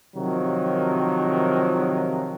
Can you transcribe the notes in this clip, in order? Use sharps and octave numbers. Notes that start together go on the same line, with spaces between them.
C3 D#3 F3 F#3